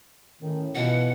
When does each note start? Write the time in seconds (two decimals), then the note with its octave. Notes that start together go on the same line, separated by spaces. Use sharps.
0.41 A2 D#3 C#4
0.75 B2 E3 B3 F4 F#5